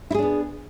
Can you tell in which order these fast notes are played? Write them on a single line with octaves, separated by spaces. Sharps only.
E4 G#4 D4 B3